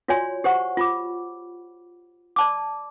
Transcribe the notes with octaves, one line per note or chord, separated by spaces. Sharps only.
F4 F#4 C#5 D5 G#5 C6
G4 C5 F#5 C#6
F4 B5 D6
D5 A5 D6